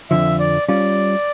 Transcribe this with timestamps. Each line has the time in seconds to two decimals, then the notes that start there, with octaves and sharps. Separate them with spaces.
0.10 F2 D3 F3 E5
0.39 D5
0.68 G3 C#4 F4 D5